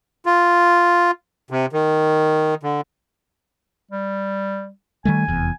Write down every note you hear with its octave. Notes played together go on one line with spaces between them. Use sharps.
F4
C3
D#3
D3
G3
D#3 G3 A3 G#5
F1 E2